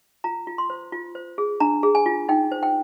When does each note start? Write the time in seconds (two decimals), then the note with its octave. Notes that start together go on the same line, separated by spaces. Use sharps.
0.24 F4 A#5
0.47 F4
0.58 C6
0.70 C5
0.92 F4
1.15 C5
1.38 G#4
1.60 D4 A#5
1.83 G#4
1.95 G#5
2.06 F4
2.29 D#4 G5
2.52 C5
2.63 G5